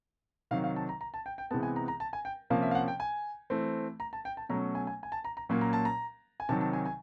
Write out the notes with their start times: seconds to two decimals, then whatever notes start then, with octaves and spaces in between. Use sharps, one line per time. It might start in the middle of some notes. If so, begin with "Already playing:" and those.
0.51 C3 D#3 F#3 F5
0.64 F5
0.76 A5
0.89 A#5
1.01 A#5
1.14 A5
1.26 G5
1.38 G5
1.51 C3 E3 G#3 B3 A5
1.63 G#5
1.76 A#5
1.88 A#5
2.00 A5
2.13 G#5
2.25 G5
2.50 C3 F3 A#3 C#4 F5
2.63 E5
2.71 F5
2.75 F#5
2.88 G5
3.00 G#5
3.50 E3 A3 C4
4.00 A#5
4.13 A5
4.25 G5
4.37 A5
4.49 B2 F#3 A3 C#4 A#5
4.75 G#5
4.87 G#5
5.03 G#5
5.12 A5
5.25 A#5
5.37 A#5
5.49 A#2 F#3 A#3 C#4
5.61 A#5
5.73 A5
5.85 A#5
6.40 G#5
6.49 C3 D#3 F#3 A5
6.61 A5
6.73 G#5
6.86 G#5